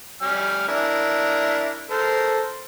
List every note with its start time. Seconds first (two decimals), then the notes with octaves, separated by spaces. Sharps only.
0.22 G3 G#5 F6
0.68 D4 E4 A#4
1.91 A4 A#4 C5